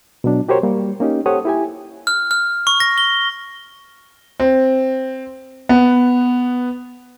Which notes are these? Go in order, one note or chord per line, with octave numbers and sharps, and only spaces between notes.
B2 F#3 D4
F#4 G4 A#4 C5 C#5
G3 A#3
A#3 C#4 D#4 G4
G4 A4 C5 C#5 F#5 D#6
E4 G4 G#5
F6
F6
C#6
A#6
G7
C4
B3